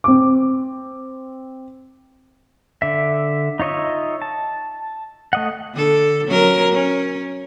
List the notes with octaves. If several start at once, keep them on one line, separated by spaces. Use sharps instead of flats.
C4 D6
D3 E5
D#4 F4 C#5 D#5 E5
A5
A3 D#5 F#5
D3 A4
F#3 C#4 A#4
C#4